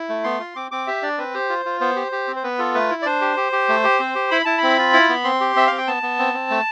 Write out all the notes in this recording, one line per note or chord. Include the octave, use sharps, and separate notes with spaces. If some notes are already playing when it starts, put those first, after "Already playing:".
Already playing: E4
A3
B3 C6
F4
C4 D6
C4 D6
G4 E5
D4 D5
C4 B4
G4 C5
F4
F4
B3 C5
G4
G4
C4
C5
B3 B4
F4 A4
A3 B4
E4
D5
D4 C5
G4
G4
G4
A3
G4
C4
G4
E4 B5
E4 A5
C4 B5
F4
E4
B3
C4 C6
G4
C4 E5
C4 F5
G5
B3 A5
B3
C4
C4
A3